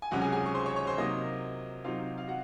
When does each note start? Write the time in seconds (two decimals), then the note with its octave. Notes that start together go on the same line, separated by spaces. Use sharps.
0.02 G#5
0.11 C#2 C3 F#3 C#4 F#4 F#5
0.22 G#4 G#5
0.32 G#4 G#5
0.46 C#6
0.54 C5 C6
0.65 C#5 C#6
0.76 C#5 C#6
0.87 C5 C6
0.98 C3 F#3 A#3 D#4 D#5
1.84 C3 F#3 C4 D#4 F4 F5
2.18 F5
2.28 F#4 F#5